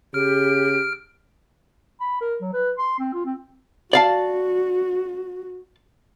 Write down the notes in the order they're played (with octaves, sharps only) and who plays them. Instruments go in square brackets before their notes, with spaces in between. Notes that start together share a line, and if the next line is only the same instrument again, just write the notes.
[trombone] C#3 [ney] G4 [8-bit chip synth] F6 [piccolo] D7
[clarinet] B5
A#4
F#3
B4
C6
C4
F4
C4
[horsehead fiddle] F#4 [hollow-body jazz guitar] D5 F5 A5